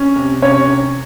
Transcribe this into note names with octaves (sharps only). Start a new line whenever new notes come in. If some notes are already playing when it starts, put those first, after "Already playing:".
Already playing: C#4
C3
C3 C#4 C#5
C#4